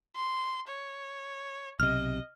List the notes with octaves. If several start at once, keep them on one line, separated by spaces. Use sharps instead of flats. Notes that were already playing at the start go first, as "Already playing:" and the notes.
C6
C#5
B1 C3 D#5 F6